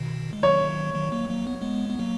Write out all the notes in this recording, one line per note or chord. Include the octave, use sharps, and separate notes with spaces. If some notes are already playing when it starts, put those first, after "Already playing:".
Already playing: B2 D#3
G#3
D#3 F#3 C#5
D#3 F#3
F#3 A#3
F#3 A#3
B3
G#3 B3
B3
F#3 A#3